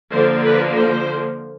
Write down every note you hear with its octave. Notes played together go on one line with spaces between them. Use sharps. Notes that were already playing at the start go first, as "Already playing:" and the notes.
D3 F3 A#3 C5
B4
C5